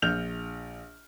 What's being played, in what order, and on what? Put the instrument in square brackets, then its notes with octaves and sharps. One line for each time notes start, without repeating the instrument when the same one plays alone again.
[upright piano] A#1 F6 G6 F7